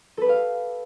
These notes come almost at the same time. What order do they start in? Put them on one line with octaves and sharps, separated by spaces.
A4 B4 G4 F5